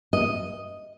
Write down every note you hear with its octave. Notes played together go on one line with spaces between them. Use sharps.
D#5